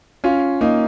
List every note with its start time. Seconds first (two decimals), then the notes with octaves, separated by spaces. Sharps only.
0.24 C#4 F4
0.61 A#3 D#4